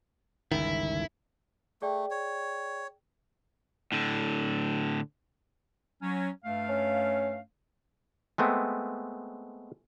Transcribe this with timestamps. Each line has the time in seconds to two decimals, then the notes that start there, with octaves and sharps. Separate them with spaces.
0.52 G1 C#2 D#3 E4
1.82 A3 G#4 D5 G5
2.11 C#5
3.92 A2 D3
6.02 F#3 C#4
6.44 G2 A3 F5
6.69 C#4
8.38 G#3 A3 B3 C4